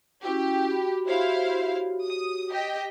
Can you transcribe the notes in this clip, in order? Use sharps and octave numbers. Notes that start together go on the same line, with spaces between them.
C#4 E4 F#4 G4
F#4 B5
E4 F#4 G4 C5 C#5 F5
D#6
G4 D#5 G5